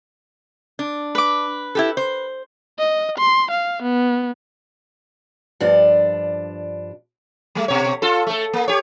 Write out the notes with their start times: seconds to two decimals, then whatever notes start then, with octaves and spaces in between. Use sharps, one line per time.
0.79 D4
1.15 B4 D6
1.75 E4 G4 A4
1.97 C5
2.79 D#5
3.18 C6
3.51 F5
3.83 B3
5.60 G2 F3 D4
7.55 G3 A3
7.68 B2 C#5
8.02 F4 A4
8.27 A3 A4
8.53 A#3
8.68 G4 C#5